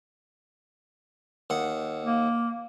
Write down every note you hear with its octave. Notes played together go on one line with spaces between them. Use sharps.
D#2 F#5
A#3